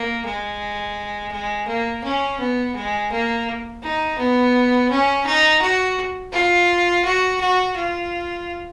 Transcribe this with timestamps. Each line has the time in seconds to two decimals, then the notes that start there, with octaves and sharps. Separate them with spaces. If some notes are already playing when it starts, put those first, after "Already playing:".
Already playing: A#3
0.25 G#3
1.32 G#3
1.68 A#3
2.03 C#4
2.39 B3
2.75 G#3
3.11 A#3
3.82 D#4
4.18 B3
4.90 C#4
5.25 D#4
5.61 F#4
6.32 F4
7.04 F#4
7.40 F#4
7.76 F4